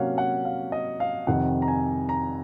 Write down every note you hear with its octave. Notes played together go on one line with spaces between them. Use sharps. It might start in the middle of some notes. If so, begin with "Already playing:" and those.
Already playing: C3 F#3 A#3 C#4 C#5 F5 F#5
F#5
F5
D#5
F5
F2 C3 D#3 F#5
A#5
G#5
A#5